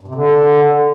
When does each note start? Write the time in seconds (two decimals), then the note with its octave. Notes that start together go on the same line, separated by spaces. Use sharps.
0.01 G2
0.08 C3
0.15 D3